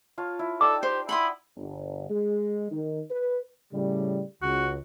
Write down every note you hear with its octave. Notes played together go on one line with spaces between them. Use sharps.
F4 C#5 A5
E4
D#4 A4 D5 G5 D6
G4 C5
E4 F#5 B5 C6 D#6
G1
G#3
D#3
B4
A2 C#3 G3
C#2 F#4